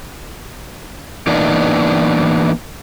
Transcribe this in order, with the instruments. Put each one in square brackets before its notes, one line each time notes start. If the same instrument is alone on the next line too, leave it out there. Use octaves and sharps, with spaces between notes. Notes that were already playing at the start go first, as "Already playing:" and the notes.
[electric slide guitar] E3 A#3 B3 D4 D#4